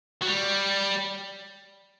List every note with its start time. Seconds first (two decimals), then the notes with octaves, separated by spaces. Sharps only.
0.21 F#3
0.26 G3